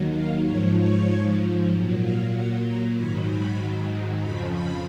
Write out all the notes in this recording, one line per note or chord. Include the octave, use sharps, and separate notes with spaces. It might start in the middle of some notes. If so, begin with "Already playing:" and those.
Already playing: D#2 D#3 F#3
F5
G#2 F3 C#5
C#5
A#2 F#3
F5
F#5
A#5
G#2 D#3 F#3 B5
B5
F2 C#3 F3 B5
B5